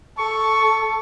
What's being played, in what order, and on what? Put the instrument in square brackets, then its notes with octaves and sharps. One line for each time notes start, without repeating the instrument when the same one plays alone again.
[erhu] A4 [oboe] C#6